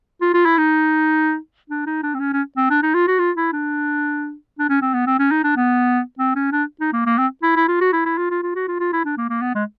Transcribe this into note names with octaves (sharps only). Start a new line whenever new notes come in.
F4
F4
E4
D#4
D4
D#4
D4
C4
C#4
C#4
C4
D4
D#4
F4
F#4
F4
E4
D4
D4
C#4
C4
B3
C4
C#4
D#4
D4
B3
C4
C#4
D4
D#4
A#3
A#3
C4
E4
E4
F4
F#4
E4
E4
F4
F4
F4
F#4
F4
F4
E4
D4
A#3
A#3
B3
G#3